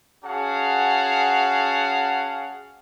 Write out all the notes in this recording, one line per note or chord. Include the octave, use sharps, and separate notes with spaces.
C#4 F#4 G#4 F5 F#5 A5